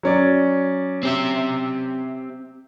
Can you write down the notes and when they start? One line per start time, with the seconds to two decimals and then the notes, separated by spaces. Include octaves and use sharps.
0.03 F#3 C#4 D5
1.03 C4 G4 E5